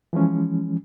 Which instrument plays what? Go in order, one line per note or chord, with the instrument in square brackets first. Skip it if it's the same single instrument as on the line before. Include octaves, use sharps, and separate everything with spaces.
[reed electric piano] E3 F3 G#3 C#4